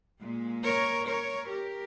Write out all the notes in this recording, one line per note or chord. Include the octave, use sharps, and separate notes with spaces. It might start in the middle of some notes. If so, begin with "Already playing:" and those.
A#2 G#3
A#4 C#5
A#4 C#5
G4 A#4